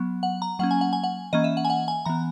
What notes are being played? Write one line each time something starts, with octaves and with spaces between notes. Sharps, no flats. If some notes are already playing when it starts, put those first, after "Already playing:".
Already playing: F#3 B3
F#5
A#5
F#3 A#3 C#4 F#5
G#5
F#5
G#5
F#5
E3 A#3 C#4 D#5
E5
F#5
G#5
F#5
G#5
E3 B3 A#5